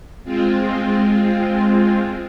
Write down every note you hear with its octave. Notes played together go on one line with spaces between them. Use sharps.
G#3 C4 F4